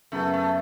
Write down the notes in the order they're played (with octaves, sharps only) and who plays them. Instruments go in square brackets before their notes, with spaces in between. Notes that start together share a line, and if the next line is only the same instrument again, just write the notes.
[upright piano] F#2 C#3 F#3 B3 [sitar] A3
[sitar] A3